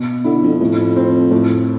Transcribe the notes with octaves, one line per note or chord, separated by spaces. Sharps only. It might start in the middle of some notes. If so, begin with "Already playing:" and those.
Already playing: B2
D3 E4
F2
F2 A2
C4
A2